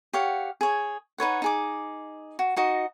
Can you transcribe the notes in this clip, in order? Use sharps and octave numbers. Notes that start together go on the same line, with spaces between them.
G4 C#5 F5 F#5
G#4 C#5
D#4 B4 C#5 F#5
D#4 G#4 D6
F#4
D#4 F#4 D#5